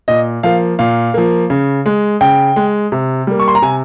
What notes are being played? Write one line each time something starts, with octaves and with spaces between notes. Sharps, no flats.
A#2 D#5
F3 A#3 F5
A#2 F5
F3 A#3
C#3
G#3
C#3 G5
G#3
C3
G3 A#3
C#6
C6
A#5
C3 G#5